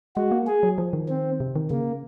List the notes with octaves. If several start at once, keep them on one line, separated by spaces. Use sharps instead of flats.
G#3 F#4
A#3
G#4
F#3
F3
D#3
C4
C3
D#3
C#3 A#3